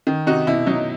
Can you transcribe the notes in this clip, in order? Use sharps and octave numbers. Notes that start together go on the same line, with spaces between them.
D#3
C3 D#4 F#4
B2 E4
F#3 D#4